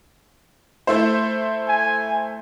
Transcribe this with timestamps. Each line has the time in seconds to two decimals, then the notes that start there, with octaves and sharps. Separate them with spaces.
0.87 A3 E4 C5
1.68 G#5